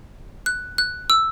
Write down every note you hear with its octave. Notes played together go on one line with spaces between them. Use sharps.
F#6
F#6
E6